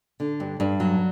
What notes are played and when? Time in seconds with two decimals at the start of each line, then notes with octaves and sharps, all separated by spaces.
0.20 D3
0.40 G2
0.60 G2
0.80 F#3